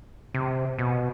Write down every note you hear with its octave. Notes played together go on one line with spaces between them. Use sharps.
C3
B2